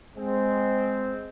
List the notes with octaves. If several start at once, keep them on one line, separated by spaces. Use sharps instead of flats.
G#3 C4